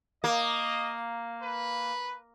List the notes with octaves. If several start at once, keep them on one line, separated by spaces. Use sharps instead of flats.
A#3 D#5
B4